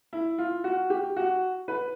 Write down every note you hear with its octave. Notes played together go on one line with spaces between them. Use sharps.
E4
F4
F#4
G4
F#4
B4